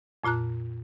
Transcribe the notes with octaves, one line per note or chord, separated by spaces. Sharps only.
F2 A#2 F4 A#5 F#6